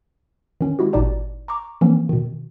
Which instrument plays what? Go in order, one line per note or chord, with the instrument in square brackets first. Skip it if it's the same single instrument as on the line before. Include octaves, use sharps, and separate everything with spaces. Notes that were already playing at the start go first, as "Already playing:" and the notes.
[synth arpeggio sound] D#3 C#4
G#3 E4 F#4 G4
G#1 A#2 D#4 G4 D5 A5
A#5 C#6 D6
E3 F3 A#3 C4 C#4
B2 D#3